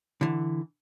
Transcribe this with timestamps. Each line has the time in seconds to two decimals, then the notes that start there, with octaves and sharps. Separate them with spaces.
0.21 D3 E3